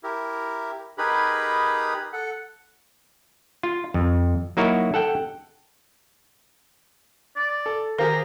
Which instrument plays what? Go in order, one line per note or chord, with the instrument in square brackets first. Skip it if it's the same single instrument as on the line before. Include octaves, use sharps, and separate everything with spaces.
[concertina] E4 G4 A#4
D#4 G4 G#4 A#4 B4 B5
A4 F#5
[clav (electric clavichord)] F4
F2
F#3 A#3 D#4 E4 F#4 A#4
A4 F#5 G5
[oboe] D5
[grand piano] A4
[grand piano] D#3 G4 G#4 [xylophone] A#4 C5 F5 [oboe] A#5